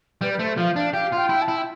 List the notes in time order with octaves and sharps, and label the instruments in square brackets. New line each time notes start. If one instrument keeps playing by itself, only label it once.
[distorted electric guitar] G3 [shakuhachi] B4
[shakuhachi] B4
[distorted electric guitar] A3 [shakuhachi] C5
[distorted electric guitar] F3 [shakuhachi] F5
[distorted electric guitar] D4 [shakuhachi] F5
[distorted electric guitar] G4 [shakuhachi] F5
[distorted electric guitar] F4
[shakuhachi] G5
[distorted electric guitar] E4
[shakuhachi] A5
[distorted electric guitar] E4
[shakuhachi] G5